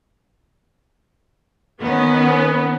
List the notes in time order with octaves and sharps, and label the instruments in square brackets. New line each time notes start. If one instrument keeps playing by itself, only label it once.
[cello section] D#3 C#4 [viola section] B3